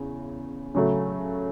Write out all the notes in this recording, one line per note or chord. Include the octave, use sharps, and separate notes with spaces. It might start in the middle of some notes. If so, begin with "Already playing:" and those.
Already playing: E2 C#3
C#3 F#3 A3